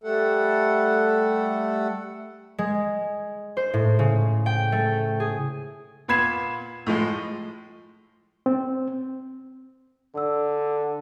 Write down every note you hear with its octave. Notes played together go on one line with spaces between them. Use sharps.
G3 A3 A4 F#5
G#3
C5
A2
C#3
G5
A3
G#4
A#2 B3 B5 G#6 C7 E7
A2 F3 G#3
C4
D3 D5 E6